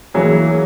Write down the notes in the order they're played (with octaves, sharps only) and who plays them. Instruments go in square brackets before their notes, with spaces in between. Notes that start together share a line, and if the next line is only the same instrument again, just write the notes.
[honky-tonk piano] E3 A#3 E4 G#4 [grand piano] F#3